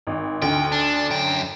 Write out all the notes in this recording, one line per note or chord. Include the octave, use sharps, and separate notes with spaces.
G#1
D2 G5
D4
F#2 G5